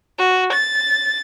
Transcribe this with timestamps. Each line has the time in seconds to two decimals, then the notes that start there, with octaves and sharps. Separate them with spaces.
0.19 F#4
0.53 A6